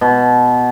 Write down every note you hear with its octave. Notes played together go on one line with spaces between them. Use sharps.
B2